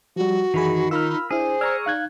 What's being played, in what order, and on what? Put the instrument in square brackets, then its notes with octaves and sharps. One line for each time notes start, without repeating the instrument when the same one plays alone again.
[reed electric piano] F3 G3 [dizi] F#4
[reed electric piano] F#2 B5 [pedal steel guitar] D#3 [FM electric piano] E3 G#4
[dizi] D#4 [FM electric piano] F4 A#4 B5 [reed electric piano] E6 F6
[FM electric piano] D4 E4 [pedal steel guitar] G#4 [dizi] C5
[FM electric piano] D5 A#5 C#6 [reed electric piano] E6 F6 G#6
[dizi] D#4 [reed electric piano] F5 F#6 G#6